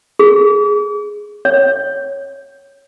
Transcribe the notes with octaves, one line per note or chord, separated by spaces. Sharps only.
G#4
C#5